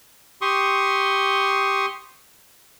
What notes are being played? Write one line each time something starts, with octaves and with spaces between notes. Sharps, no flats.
G4 C6 C#6 D#6